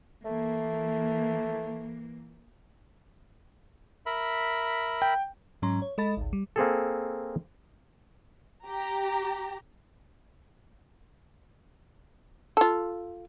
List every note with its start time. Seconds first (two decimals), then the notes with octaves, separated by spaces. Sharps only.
0.24 E3 A3 A#3
4.06 A#4 E5 B5
5.02 G5
5.62 G#2 F#3 C#4 A#5 C6
5.82 C#5
5.98 G#3 A4 D#5 B5 A6
6.17 G#1 C#2
6.33 G3
6.56 A#3 C4 G#4 A4
8.67 G4 A#5
12.57 F4 A4